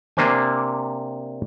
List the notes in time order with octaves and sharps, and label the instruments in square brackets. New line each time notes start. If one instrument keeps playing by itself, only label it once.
[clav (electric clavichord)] C3 A#3 D4 C5 G#5